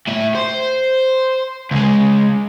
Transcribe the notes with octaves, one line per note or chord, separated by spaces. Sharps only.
A2 E5
C5
C#2 G#3